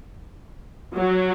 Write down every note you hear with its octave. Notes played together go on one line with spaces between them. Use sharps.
F#3